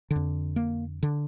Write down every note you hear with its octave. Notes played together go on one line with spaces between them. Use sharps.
D3
F2
A#3
D3